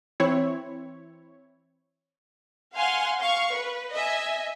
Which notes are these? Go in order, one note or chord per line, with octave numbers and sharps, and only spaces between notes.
E3 C4 E4 C#5
F5 F#5 G#5 C6
F5 C#6
B4
D#5 E5 G#5